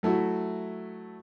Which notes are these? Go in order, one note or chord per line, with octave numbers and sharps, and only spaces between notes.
F#3 A3 E4 F#4